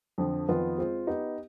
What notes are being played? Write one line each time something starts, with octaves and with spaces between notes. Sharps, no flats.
F2 D3 F3
F2 D#3 B3 F4 B4
G#3 C4 F4 C5
B3 D#4 G4